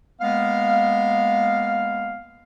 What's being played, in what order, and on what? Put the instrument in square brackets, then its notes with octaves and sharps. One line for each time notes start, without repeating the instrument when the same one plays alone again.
[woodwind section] G#3 A#3 B3 F5